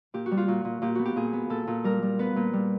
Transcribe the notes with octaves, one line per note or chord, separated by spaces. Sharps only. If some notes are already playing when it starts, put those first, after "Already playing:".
A#2 G4
F#4
G3
F4
A#2 F#4
A#2
A#2 G4
B3 F#4
G4
A#2 G#4
B3
A#2 A4
A#2
G3 A#4
G3
B3 B4
A#2
G3